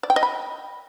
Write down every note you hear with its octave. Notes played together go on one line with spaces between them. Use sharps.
D5
G5
D#5
B5